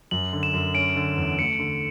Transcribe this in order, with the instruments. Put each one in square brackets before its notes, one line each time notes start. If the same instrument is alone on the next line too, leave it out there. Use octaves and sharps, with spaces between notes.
[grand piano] F#2 [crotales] F#7
[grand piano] D3
[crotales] E7
[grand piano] F#2
[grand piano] C#4 [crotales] D7
[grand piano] D3
E2
[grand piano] A3 [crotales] C#7
[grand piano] D3